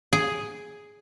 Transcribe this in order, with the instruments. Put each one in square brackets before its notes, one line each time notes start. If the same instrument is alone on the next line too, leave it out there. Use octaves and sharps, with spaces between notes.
[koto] G#4